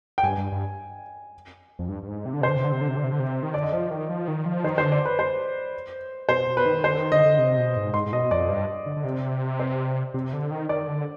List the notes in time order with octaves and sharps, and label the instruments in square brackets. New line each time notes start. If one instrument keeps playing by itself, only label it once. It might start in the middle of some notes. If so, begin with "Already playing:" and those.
[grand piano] G5
[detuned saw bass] G2 [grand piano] G#5
[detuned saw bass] G2
G2
F2
G2
G2
G#2
C3
D3
[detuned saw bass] C3 [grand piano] C5
[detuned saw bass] D3
C3
D3
C3
D3
C3
D3
C3
D3
C3
D#3
[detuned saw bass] D3 [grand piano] D5
[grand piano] D#5
[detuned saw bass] F3 [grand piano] D5
[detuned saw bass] D#3
F3
D#3
F3
[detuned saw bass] D#3 [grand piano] C5
[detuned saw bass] D3 [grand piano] C5
[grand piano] D5
B4
C5
[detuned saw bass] B2 [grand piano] C5
[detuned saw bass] B2
[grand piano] B4
[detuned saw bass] D#3
[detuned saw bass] D3 [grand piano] C5
[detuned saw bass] D#3
[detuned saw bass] D3 [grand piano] D#5
[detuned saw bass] D3
C3
B2
G#2
[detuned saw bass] G#2 [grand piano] C6
[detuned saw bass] G#2
[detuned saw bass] B2 [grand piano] D#5
[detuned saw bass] F2 [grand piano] D5
[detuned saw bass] G2
D3
D3
C3
[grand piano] C5
[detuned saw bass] C3
D3
D#3
[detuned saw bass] D#3 [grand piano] D5
[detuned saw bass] D3